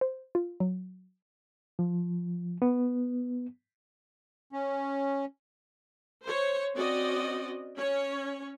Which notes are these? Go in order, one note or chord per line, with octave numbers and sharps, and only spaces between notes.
C5
F4
F#3
F3
B3
C#4
C5 C#5
C4 C#4 F#4 D5 D#5
C#4 C#5